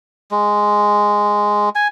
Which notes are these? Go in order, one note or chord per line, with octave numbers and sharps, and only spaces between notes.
G#3
G#5